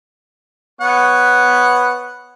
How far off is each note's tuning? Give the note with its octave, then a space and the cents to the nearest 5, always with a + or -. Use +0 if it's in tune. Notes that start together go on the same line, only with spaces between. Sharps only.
B3 +0 C#5 +0 F#5 +0